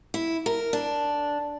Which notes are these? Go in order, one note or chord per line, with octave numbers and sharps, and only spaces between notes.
E4
A#4
D4